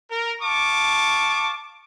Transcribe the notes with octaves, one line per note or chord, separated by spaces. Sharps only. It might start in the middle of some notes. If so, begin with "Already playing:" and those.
A#4
F5 A5 C#6 D6